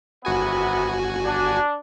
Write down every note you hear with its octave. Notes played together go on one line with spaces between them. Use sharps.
G1 F#2 C3 B3 F#4 G#5
D4